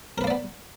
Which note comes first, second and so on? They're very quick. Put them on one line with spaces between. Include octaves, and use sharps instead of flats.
A#4 B4 A#3 D5 B3